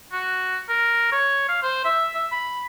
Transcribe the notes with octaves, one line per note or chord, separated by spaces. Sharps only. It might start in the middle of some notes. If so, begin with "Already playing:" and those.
F#4
A#4
C#5
F5
C5
E5
E5
B5